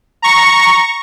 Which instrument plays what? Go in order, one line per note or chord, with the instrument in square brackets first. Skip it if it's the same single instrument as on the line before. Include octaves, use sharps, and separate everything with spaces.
[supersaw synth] A#5 C#6